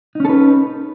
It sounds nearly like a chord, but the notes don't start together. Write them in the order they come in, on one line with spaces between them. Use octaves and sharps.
D#4 C#4 A4 B4